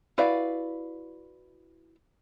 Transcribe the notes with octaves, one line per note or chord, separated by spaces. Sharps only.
E4 F#4 B4 D5 F5